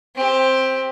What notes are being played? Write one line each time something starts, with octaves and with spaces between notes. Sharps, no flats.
C4 G4